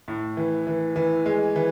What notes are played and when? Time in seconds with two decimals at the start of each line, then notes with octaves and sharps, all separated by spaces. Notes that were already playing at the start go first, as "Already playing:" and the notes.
0.08 A2
0.37 E3
0.67 E3
0.96 E3
1.26 G#3
1.56 E3